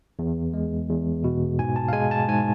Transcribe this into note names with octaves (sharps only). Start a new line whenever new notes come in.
E2
G#3
E2
B2
G#2 G#5
A5
F5
G#3 G#5
A5
G#2 G#5